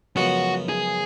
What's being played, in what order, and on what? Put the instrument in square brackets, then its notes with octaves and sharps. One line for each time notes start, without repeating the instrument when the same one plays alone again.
[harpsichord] F#2 C#3 F3 G#3 B3 [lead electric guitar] F#4
[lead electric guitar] G#4